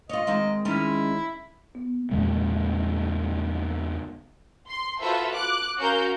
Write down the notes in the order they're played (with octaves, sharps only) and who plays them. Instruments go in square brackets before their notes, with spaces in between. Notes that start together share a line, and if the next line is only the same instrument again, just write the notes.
[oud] F4 C#5 [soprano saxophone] D#5
[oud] D#3 G#3 C4
[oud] D#3 G#3 C#4 [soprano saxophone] E4
[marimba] B3
[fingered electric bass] E2 A#2 C#3 G#3
[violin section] C6 C7
F4 F#4 A4 B4 C5 E5
D6 F#6
C#4 F#4 A#4 F5 G6